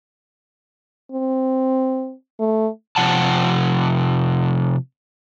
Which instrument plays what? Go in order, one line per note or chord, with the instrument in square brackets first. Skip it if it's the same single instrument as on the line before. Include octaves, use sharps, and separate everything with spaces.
[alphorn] C4
A3
[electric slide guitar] C3 F3 F#5 A5